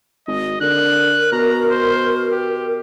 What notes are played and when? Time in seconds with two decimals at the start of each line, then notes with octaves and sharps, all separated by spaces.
0.28 G#1 D#5
0.61 D3 A#4 F#6
1.32 B2 A#5
1.71 C5
2.32 G4